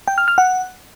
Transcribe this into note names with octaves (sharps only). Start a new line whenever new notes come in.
G5
F6
F6
F#5